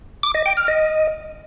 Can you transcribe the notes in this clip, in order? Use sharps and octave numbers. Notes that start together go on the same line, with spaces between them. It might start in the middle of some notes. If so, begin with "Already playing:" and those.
D6
D#5
G5
F6
D#5